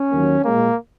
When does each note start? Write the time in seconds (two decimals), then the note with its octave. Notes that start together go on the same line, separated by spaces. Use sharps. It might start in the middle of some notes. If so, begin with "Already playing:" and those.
Already playing: C#4
0.11 D#2 D#3 F#3 A#3
0.43 A#2 G#3 A#3